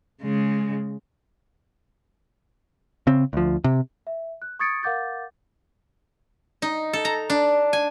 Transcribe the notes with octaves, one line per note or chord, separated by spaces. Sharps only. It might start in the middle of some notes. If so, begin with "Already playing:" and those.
C#3 G#3
C#3 C4
D2 F3
C3
E5
F#6
C#6 D#6 G#6 A6 C#7 D7
A#4 F5 F#5 D6 G6 A6
D#4
A4
A#5
D4
G#5